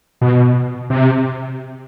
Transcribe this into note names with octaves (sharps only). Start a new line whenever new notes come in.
B2
C3